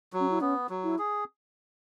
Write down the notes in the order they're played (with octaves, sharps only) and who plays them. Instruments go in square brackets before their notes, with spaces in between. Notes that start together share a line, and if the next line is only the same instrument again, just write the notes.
[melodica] F#3
[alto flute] C#4
E4
[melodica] B3 [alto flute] C#4
[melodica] F#3
[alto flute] E4
[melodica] G#4